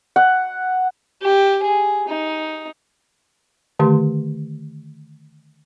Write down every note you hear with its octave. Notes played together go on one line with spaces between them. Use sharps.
F#5
G4
G#4
D#4
D3 D#3 A3 G4 C6